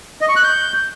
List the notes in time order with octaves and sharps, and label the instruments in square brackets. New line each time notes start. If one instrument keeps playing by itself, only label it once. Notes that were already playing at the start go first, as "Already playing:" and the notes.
[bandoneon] D#5
C#6
F#6
G6